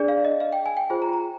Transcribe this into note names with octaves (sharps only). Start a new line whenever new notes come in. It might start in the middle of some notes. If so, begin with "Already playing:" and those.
Already playing: D4 G#4 D5
F5
D#5
F5
G5
G#5
G5
F4 G#4 C5
A#5
A#5